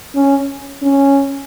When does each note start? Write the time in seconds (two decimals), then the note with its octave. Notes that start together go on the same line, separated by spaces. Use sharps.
0.15 C#4
0.82 C#4